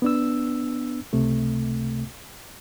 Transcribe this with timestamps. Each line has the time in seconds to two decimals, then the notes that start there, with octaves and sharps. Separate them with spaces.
0.02 B3 D4 E6
1.13 C#2 C3 A3